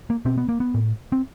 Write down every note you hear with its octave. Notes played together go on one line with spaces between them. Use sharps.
A#3
B2 C4
B3
A#3
B3
A2
C4